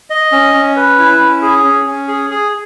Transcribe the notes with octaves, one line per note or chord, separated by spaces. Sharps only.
D#5
C#4
C#4
B4
E4
C#4
G#4
C#4
C#4
G#4
G#4